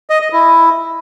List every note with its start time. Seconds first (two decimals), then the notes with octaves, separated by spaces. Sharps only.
0.10 D#5
0.21 D#5
0.33 E4